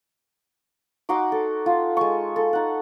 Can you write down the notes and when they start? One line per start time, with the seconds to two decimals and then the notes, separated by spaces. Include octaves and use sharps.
1.09 D#4 F#4 C6 D6
1.32 A4
1.66 F4
1.97 G#3 C#6
2.36 A4
2.53 D#4 F#5